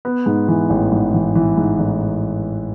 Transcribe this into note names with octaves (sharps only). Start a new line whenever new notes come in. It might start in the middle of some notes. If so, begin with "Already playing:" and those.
B3
G#2
E3
A1
G#2
E3
E3
G#2
A1